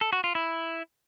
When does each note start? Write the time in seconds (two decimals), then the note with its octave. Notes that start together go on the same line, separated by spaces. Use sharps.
0.01 A4
0.13 F#4
0.24 F4
0.35 E4